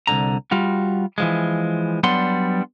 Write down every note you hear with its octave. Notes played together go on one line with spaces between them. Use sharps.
C2 F#2 D3 A#5
G3 F4 F#4
E3 F3 G#3
F#3 G3 B3 D4 F#5 C6